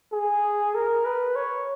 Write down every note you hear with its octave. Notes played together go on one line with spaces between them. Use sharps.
G#4
A#4
B4
C#5